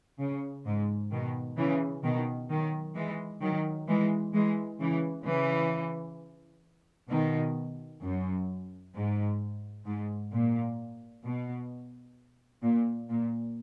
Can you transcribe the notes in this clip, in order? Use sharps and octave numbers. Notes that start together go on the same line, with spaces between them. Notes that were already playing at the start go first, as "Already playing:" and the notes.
C#3
G#2
B2 D#3
C#3 E3
B2 D#3
D#3 F#3
E3 G#3
D#3 F#3
E3 G#3
E3 G#3
C#3 E3
C#3 E3
B2 D#3
F#2
G#2
G#2
A#2
B2
A#2
A#2